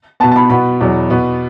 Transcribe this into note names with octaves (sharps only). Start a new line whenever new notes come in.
B2 B3 A5
A5
B5
B2 B3 B5
E2 B2 F#3
B2 B3